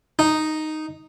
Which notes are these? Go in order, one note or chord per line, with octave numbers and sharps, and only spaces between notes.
D#4